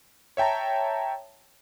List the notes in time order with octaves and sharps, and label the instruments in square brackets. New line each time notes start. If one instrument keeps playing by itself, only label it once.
[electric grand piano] C#5 E5 G5 A5 A#5